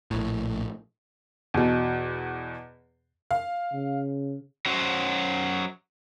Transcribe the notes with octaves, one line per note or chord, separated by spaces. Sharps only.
A#1 A2
E2 B2
F5
C#3
F#3 C#4 F#4 C5